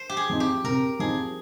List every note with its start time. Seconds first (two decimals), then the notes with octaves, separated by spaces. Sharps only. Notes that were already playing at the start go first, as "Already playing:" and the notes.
Already playing: C5
0.10 G4
0.17 G#4
0.30 F3 C4 D#4
0.40 G4
0.64 C3 A#4
0.99 F3 C4 D#4 G#4